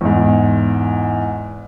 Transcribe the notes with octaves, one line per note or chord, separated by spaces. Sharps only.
E2 G#2